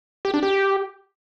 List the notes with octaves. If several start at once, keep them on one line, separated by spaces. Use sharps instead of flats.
G4
D4
G4